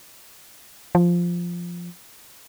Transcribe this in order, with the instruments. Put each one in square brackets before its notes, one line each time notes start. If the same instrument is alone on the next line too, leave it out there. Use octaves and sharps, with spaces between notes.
[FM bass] F3